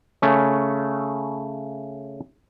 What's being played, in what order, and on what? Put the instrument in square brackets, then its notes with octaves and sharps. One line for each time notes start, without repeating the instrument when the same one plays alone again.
[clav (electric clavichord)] C#3 A3 C#4